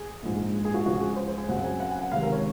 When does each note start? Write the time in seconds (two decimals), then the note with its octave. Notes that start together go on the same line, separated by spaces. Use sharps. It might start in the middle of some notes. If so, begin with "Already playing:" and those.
Already playing: G#4
0.22 A#1 G#2 F3 G#3
0.54 G#4
0.65 G#4
0.74 F#4
0.86 C#2 C#3 F3 G#3 F#4
1.02 G#4
1.16 C5
1.27 C5
1.38 G#4
1.48 F#1 F#2 C#3 F#3 C4 F#5
1.64 G#5
1.80 F#5
1.91 G#5
2.01 F#5
2.12 C#2 C3 D#3 G#3 C4 F5
2.22 A#4
2.32 C#5